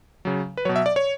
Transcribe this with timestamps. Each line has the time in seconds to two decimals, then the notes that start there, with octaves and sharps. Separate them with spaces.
0.25 C#3 F#3
0.57 B4
0.65 F#3 C#5
0.69 B2
0.76 E5
0.86 D5
0.96 C#5